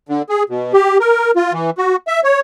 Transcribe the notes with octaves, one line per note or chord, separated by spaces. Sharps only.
D3
G#4
B2
G4
A#4
F4
E3
F#4
E5
C#5